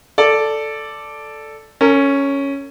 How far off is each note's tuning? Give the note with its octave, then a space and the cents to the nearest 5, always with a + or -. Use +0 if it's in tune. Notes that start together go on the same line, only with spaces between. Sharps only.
A4 +0 D5 +0
C#4 +0 A#4 -40